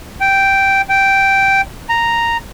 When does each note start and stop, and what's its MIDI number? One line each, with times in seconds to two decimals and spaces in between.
0.21 0.82 79
0.90 1.61 79
1.89 2.37 82